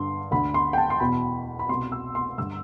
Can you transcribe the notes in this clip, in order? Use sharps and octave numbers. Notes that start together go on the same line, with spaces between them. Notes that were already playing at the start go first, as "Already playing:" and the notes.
Already playing: G2 D3 C6
D2 D3 B5
C6
G5
A5
C6
E2 B2 B5
B5
C2 B2 C6
E6
C6
G2 D3 E6